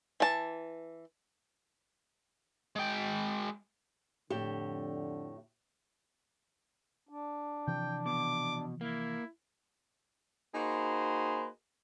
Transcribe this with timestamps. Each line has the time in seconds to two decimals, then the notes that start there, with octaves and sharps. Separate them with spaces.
0.20 E3 A5
2.76 G#3 G5
4.30 F2 A2 D3 G4
7.09 D4
7.67 C3 E3 F3 G5
8.06 B2 D6
8.81 A#3 E4
10.55 A#3 D#4 F#4 G#4 B4 C5